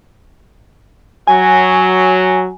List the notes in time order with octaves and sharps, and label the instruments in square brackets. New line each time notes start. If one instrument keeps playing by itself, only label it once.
[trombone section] F#3 [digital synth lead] G#5